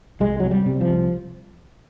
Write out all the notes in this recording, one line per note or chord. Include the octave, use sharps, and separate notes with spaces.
C2 G#3
C3 F#3
G3
C3
F3
C2